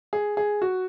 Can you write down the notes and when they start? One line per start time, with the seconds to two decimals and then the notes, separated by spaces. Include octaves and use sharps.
0.13 G#4
0.37 G#4
0.62 F#4